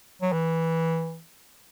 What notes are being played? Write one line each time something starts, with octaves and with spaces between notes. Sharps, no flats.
F#3
E3